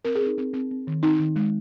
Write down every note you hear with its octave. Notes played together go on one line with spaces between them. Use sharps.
C4 A#4
G#4
C4
D#4
C4
C4
C4
D#3
C4 D#4
D#3
G#3